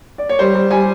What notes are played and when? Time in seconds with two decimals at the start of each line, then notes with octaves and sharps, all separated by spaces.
0.18 D5
0.29 C#5
0.39 G3 C5
0.55 G3
0.71 G3 G#5